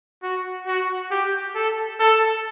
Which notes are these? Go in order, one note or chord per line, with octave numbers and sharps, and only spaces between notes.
F#4
F#4
G4
A4
A4